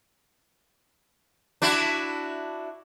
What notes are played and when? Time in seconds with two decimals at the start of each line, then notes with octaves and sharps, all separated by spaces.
1.62 D4 E4 F#4